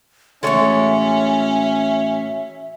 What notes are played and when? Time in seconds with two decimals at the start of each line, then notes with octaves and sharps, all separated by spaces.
0.43 A2 E3 G#3 C#4 F#4 A4 C#5 E5